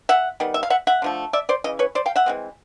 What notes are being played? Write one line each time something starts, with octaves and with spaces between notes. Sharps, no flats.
E5 F#5
D#3 G3 B3
E5
F5
E5 F#5
E5 F#5
D3 F3 A3
D5 E5
C5 D5
C#3 E3 D#5
B4 C#5
C5 D5
F5 G5
E5 F#5
E3 G#3 C4